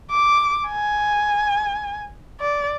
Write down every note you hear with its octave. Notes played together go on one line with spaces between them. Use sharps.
D6
G#5
D5